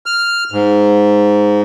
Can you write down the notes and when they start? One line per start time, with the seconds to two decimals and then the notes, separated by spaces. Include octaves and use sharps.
0.06 F6
0.52 G#2